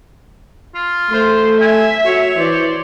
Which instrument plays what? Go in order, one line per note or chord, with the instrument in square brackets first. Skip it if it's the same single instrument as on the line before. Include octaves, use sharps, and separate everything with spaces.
[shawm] F4
[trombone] A3 [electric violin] C5
[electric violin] E5 [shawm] G#5
[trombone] F#4 [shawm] C#5
[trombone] E3 [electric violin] C5 D5